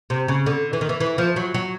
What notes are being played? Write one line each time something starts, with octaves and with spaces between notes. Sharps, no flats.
C3
C#3
D3
E3
D#3
E3
E3
F3
F#3
F#3